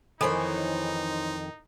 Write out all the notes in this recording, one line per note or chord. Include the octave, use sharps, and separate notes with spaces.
F2 D#3 E3 D#4 A4 C5 C#5 G#5